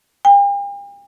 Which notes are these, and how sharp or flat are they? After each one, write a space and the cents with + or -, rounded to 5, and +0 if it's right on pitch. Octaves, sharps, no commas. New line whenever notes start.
G5 +45